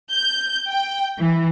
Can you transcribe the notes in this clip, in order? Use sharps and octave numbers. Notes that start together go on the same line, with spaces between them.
G6
G5
E3